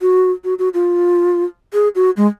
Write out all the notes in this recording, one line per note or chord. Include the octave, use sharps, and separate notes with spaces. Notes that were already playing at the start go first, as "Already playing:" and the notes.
F#4
F#4
F#4
F4
G#4
F#4
G#3